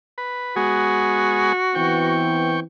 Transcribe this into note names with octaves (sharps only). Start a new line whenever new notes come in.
B4
G#3 B3 F#4 G#4
E3 B3 C4 G5 C#6